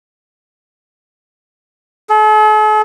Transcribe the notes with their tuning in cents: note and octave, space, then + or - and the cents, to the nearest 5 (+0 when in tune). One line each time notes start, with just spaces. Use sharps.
A4 -45